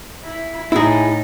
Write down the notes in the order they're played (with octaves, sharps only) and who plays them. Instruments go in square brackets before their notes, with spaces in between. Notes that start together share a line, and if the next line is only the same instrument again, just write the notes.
[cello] E4
[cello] A2 D#4 [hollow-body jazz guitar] E4 G#4